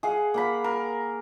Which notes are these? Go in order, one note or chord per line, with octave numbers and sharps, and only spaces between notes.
G#4 F5 F#5
A#3 F#5 B5
A#4